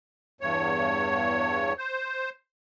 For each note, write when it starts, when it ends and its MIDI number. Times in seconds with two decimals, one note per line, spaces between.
0.41 1.73 40
0.41 1.73 43
0.41 1.73 73
1.78 2.30 72